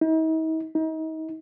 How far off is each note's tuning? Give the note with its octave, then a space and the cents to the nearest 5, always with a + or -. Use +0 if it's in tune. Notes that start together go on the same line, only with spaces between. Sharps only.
D#4 +45
D#4 +35